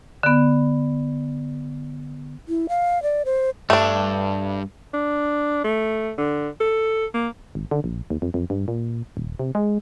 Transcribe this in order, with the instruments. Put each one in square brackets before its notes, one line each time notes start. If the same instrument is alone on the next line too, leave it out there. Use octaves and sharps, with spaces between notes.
[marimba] D3 B3
[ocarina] E4
F5
D5
C5
[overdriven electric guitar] G2 [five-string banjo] A3 D4
[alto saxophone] D4
A3
D3
A4
A#3
[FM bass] G#1
D3
A#1
D#2
F2
F2
G2
A#2
D#1
C3
G#3